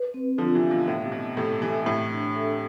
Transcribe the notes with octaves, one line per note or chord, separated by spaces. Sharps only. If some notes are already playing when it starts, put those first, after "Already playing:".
Already playing: B4
C4
D3 F3 F4
C3 E3
F5
B2
A2 E5
C3
B2 E4
A2 C3 A4
C3 E3 E4
A2 C3 E5
D4
A4